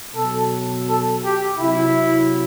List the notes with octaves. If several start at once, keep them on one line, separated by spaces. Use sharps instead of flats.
B2 F#3 A4
A4
G4
C3 F#3 E4